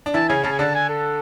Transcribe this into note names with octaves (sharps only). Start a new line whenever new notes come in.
D4
E3 E4 A5
C#3 C#4 G#5
C#3 C#4 A5
G#5
D3 D4 A5
G#5
A4